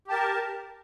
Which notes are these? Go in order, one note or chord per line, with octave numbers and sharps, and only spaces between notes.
G4 A#4 A5